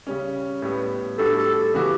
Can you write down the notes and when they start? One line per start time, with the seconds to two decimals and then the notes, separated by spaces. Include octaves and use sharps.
0.07 C#3 G3 C#4
0.62 A2 G3 B3
1.18 A2 G3 D4 F#4 A4
1.37 A4
1.55 A4
1.74 C#3 E3 B3 F#4 G4